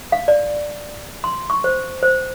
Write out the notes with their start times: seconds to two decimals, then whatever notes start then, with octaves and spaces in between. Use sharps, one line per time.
0.12 F5
0.28 D5
1.24 C6
1.50 C#6
1.64 C5
2.02 C5